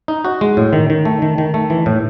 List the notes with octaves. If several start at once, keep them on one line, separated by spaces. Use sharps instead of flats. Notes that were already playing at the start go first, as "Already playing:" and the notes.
D#4
F#4
G#3
A2
D#3
D#3
A3
D#3
D#3
A3
E3
A2